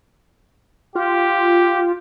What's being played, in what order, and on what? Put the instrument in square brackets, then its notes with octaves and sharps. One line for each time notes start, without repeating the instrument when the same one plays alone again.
[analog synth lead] F4 [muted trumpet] G4